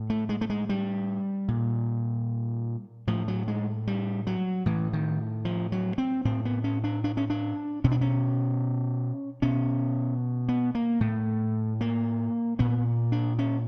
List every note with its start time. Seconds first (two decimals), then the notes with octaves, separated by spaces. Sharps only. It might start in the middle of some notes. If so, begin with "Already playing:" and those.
Already playing: A2
0.10 A3
0.29 G#3
0.41 A3
0.50 G#3
0.69 G3
1.48 A#2
3.07 A2 F3
3.28 F#3
3.48 G#3
3.87 G3
4.27 F#3
4.66 A2 E3
4.93 D#3
5.45 F3
5.72 F#3
5.98 C4
6.25 A2 C4
6.45 B3
6.64 C#4
6.84 D4
7.04 D4
7.17 C#4
7.30 D4
7.84 B2 C#4
7.91 D4
8.01 C#4
9.42 B2 C#4
10.49 B3
10.75 A#3
11.00 A2 A3
11.81 A#3
12.59 A#2 B3
13.12 D4
13.39 C#4